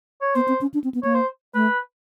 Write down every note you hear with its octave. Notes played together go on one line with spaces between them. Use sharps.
C#5
B3 C5
C4
C#4
D4
C4
B3
A#3 C#5
C5
A3 B4